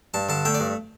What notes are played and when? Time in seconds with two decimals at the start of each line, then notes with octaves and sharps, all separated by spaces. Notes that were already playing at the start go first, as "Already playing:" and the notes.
0.14 G2 A5
0.29 D3 A5
0.45 A3 G5
0.55 D5
0.60 G2